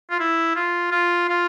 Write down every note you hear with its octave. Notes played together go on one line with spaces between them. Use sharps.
F4
E4
F4
F4
F4